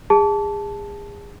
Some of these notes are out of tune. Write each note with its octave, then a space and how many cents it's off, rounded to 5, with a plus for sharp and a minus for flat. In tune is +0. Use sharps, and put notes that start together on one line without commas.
G#4 -30 A5 -5